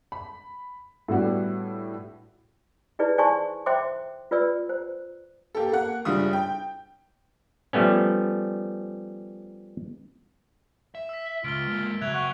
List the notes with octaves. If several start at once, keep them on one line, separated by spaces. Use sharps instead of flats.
B5
A2 G3 B3 D4 F#4 G4
D#4 E4 G#4 B4 D5
C5 D5 G#5 A5 C6 C#6
C5 E5 G5 C6 D6
F4 B4 D5 E6
C5
A#3 G4 A4
A#3 F#5
F#1 G3 D4 F4 D#6
G5
F3 G3 A3 B3 C#4
E5
E6 B6
C#2 F4 D7 G7
G#3 A#3
C#3 F#3 E5 F#6 G#6 F7
F#5 C#6